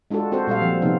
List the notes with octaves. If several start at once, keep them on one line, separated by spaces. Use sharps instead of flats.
G#3 D4 F4 F#4 A4
C4 F#4 A4 C5
A#2 G3 A4 F5
F3 C4
C3 F3 B3 D#4